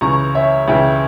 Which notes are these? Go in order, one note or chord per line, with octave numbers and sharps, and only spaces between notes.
C#2 C#3 E3 A#5 C#6
C#5 E5
C#2 C#3 E3 E5 G5